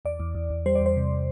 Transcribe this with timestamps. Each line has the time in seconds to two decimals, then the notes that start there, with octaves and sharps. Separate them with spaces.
0.05 E2 D5
0.20 E2
0.35 E2
0.50 E2
0.66 G3 C5
0.75 D5
0.80 E2
0.86 C5
0.96 C3